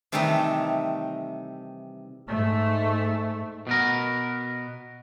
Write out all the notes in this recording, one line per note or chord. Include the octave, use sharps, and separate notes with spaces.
C3 D#3 E3 G3 A3 D#4
G#2 A3
B2 B3 A#4